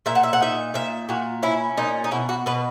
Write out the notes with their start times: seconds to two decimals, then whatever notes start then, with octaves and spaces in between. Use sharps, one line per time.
0.06 A#2 E5
0.15 F#5
0.23 E5
0.33 F#5
0.41 D#4 E5
0.74 A#2 E5
1.09 A#2 F#4
1.43 C#4 E4
1.77 A#2 D#4
2.04 D#4
2.11 B2 E4
2.29 F#4
2.46 B2 B4